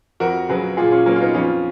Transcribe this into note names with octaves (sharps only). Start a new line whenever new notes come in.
F2 F#4 A#4
C#3 F#3 G#4 B4
A#2 F4 G#4
C#4 F4
F#3 A#3 C#4
F4
B3 D#4
F2 C#4 F4